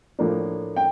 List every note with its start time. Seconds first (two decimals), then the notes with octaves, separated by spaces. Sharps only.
0.19 A2 F3 A#3 D4
0.76 G5